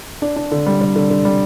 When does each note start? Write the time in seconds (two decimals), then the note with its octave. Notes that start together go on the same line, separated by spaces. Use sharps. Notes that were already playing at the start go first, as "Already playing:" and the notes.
0.22 D4
0.36 D4
0.51 D3
0.66 G3
0.81 G3
0.96 D3
1.10 D3
1.25 G3